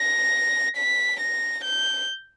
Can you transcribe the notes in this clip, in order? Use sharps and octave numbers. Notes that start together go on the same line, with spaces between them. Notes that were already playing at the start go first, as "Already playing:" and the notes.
Already playing: A#6
B6
A#6
G6